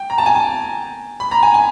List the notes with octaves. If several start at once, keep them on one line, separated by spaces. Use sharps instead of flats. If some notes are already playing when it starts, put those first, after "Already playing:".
Already playing: G5
A#5
A5
G#5
A5
B5
A#5
G#5
G#5